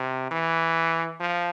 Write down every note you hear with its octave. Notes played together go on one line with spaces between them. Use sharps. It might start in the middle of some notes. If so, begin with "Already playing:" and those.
Already playing: C3
E3
F3